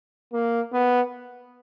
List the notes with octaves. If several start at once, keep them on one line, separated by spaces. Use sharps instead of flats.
A#3
B3